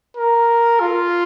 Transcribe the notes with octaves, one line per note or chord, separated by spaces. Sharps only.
A#4
F4